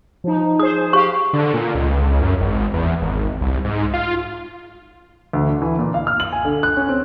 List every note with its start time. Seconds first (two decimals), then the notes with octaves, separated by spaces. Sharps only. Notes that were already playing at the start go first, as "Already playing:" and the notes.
0.24 F3 D#4
0.59 G#4 C5 D#6
0.93 G4 F5 C#6
1.33 D3
1.54 A#2
1.75 C#2
2.22 F#2
2.41 G#1
2.74 E2
3.02 G#1
3.41 C2
3.64 G#2
3.94 F4
5.33 D2
5.49 D4
5.62 E3
5.79 A#2
5.94 F5
6.07 F6
6.20 F#7
6.33 G#5
6.45 D3
6.63 F#6
6.77 C#4
6.89 C4